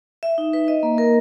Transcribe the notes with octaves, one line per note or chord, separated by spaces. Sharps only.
E5
D#4
B4
D#5
A#3
A#4